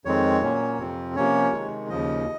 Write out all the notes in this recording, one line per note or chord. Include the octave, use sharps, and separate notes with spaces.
F2 D#3 G#3 C4 C#5
A#2 F#3 A#3 C#4
F2 C3 F3 C4
C3 F3 A#3 C#4 C#5
C3 D#3 G#3
D#2 C#3 F3 D#5